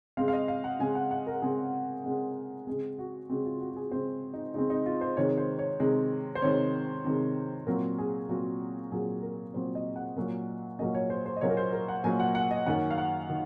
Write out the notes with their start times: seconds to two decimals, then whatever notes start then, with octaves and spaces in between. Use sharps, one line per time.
0.17 C#3 G#3 C4 F5
0.28 F5
0.33 D#5
0.48 F5
0.64 F#5
0.79 C#3 G#3 C4 G#5
0.95 F#5
1.11 F#5
1.27 A#4
1.42 C#3 G#3 C4 G#4
2.04 C#3 G#3 C4
2.67 C#3 G#3 C4 G#4
2.99 F#4
3.30 C#3 G#3 C4 F#4
3.45 F4
3.61 F#4
3.72 F#4
3.76 G#4
3.91 C#3 G#3 C4 C5
4.34 D#4
4.54 C#3 G#3 C4 D#4
4.70 D#4
4.86 F4
5.01 C5
5.17 C3 D#3 G#3 C#5
5.38 C5
5.59 C#5
5.80 C3 D#3 G#3
6.35 C5
6.42 C3 D#3 G#3 C#5
7.04 C3 D#3 G#3
7.67 A#2 F#3 C4 A#4
7.98 G#4
8.29 A#2 F#3 C4 F#4
8.92 A#2 F#3 C4 G#4
9.23 A#4
9.54 A#2 F#3 C4 C5
9.75 D#5
9.96 F#5
10.16 A#2 F#3 A#3 C#4
10.79 A#2 F#3 A#3 C#4 D#5
10.95 C#5
11.10 C5
11.26 C5
11.36 D#5
11.41 A#2 F#3 A#3 C#4 C#5
11.50 A#4
11.57 C5
11.73 A#4
11.88 F#5
12.04 A#2 F#3 A#3 C#4 G#5
12.20 F#5
12.35 F#5
12.51 D#5
12.66 F#2 D#3 A#3 C#4 F#5
12.91 F5
12.98 F#5
13.30 D#3